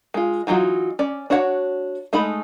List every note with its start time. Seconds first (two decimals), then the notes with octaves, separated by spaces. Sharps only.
0.14 G#3 F4
0.47 E3 F#3 D#4 F4 F#4
0.99 C#4 D5
1.30 D4 F#4 C#5 F#5
2.13 G#3 A3 D#4 A4 B5